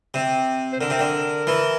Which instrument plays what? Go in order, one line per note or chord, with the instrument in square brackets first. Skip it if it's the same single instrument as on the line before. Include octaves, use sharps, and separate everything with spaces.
[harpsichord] C3
[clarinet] C5
[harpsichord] D3 [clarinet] A#4
[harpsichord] C3
D3
E3